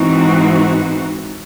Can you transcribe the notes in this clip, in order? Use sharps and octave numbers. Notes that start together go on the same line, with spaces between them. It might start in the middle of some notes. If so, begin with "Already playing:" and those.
Already playing: G#2 E3 C4 D#4 F#4